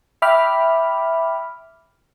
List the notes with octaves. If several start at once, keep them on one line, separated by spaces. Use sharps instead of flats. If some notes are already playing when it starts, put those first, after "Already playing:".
E5 G5 B5 D6 F6